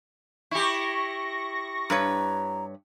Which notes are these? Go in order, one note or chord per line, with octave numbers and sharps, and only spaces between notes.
E4 G4 C#6 A#6
G2 B4 C#5 A#5